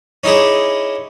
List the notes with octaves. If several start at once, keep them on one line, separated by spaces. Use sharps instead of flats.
C#4 D#4 E4 G4 G#4